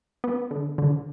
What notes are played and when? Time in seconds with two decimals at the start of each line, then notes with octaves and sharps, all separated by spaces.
0.24 B3
0.51 D3
0.78 D3